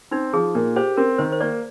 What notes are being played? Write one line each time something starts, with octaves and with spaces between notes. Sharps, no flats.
C4 D#4
F3 G#4
A#2 A#4
G4 C5
C4 A#4
D#3 C5
C5
A#3 D5